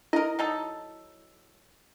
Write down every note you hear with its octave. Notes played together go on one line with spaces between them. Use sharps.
E4 A#4 D#5
F#3 D#4 A4